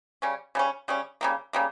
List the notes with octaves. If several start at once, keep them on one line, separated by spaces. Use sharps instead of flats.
C#3 G3 C#4
C#3 G3 C#4
C#3 G3 C#4
C#3 G3 A#3
C#3 G3 A#3